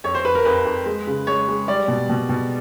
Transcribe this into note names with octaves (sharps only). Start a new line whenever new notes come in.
F2 C#5
C5
F2 B4
A#4
F2 B4
F2
G#3
C#3
G#3 C#5
G#3
G3 D5
B2
B2
B2